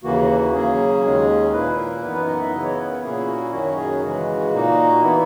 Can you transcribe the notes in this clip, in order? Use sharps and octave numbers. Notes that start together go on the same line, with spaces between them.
D#2 C#3 E3 A#3 F#4
C#3 F#3 A#3 C#4 G#4
D#2 D#3 G#3 C#4
A#2 A#3 E4 B4
A#4
F#2 E3 B3 D#4 B4
B4
D#5
F#5
E5
C#3 E3 B3 E4 D#5
C#5
B4
A#4
A#2 A#3 C#4 E4 G#4
F#4
F#2 D#3 F#3 C#4 F#4
G#4
C#3 E3 G#3 F#4
A#2 A#3 D#4
E3 B3 E4